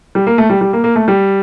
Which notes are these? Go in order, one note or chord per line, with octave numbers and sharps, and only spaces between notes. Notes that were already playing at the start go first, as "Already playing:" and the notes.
G3
A#3
A3
G3
G3
A#3
A#3
A3
G3